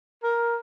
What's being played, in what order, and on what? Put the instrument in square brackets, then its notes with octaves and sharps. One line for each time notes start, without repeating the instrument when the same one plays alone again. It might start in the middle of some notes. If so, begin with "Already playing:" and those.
[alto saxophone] A#4